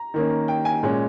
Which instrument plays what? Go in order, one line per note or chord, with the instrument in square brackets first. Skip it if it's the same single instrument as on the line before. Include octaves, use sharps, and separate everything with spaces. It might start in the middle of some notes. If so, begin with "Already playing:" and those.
Already playing: [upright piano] A#5
D#3 A#3 C#4
G5
G#5
A#2 G#3 C#4